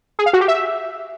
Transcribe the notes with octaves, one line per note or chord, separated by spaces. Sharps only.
G#4
F5
F#4
G4
E5